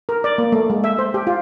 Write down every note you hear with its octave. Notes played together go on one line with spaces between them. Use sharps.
A#4
D5
A#3
A3
G#3
E5
C5
G4
F4